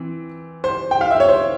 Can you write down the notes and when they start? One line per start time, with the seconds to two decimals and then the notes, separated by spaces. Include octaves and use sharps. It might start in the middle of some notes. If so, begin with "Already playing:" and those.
Already playing: E3 C4
0.64 C5
0.91 G5
1.01 F5
1.11 E5
1.20 C#5
1.29 C5